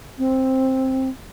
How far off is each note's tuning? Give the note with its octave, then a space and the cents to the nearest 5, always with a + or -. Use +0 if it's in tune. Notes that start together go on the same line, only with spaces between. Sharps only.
C4 +5